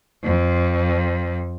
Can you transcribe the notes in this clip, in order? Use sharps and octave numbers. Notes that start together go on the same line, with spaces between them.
F2